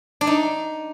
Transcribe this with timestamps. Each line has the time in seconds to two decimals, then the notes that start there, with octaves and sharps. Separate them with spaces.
0.21 D4
0.27 D#4